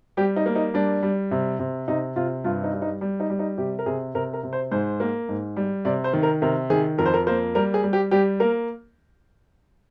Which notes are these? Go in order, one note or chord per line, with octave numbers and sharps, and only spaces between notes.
G3 G4
D#4
A#3
D#4
G3 D4
G3
C3
C3
C3 D#4
C3 F4
G2 F4
D#4
G3
D#4
G3
D#4
G3
D#4
C3 G4
A#4
C3 G#4
C3 A#4
A#4
C3
C5
G#2 C5
A#3
G#2
G3
C3 D5
C5
D#3
A#4
C3 A#4
D#3 G#4
F2 A#4
C5
A#4
A#3 C5
G3 A#4
G#4
G3
G4
G3 G4
A#3 A#4